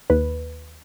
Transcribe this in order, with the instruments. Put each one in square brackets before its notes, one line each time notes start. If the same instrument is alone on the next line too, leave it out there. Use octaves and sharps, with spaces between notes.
[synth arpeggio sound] D#2 B4